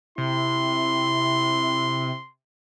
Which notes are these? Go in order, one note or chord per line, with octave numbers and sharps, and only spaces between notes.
C3 E4 C6